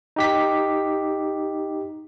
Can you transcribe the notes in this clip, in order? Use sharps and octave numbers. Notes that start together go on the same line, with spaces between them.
D#4 G4 B6